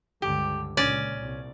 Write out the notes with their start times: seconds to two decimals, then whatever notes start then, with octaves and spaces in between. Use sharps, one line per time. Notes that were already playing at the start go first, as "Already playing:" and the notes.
0.22 C#2 G2 D3 G4
0.77 C#2 A#2 C#4 D5
1.20 C2